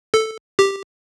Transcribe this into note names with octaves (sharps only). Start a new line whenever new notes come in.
A4
G4